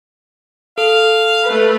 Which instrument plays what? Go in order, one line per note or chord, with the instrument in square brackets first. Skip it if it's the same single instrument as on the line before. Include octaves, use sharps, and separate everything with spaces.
[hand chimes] A4 [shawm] F5
[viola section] A3 B4